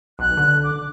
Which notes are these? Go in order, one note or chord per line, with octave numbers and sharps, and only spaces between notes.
B1 F#6
D3
D6